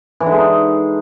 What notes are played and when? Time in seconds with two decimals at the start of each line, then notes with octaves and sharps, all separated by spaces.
0.20 E3
0.26 D3
0.32 G#3
0.38 D#4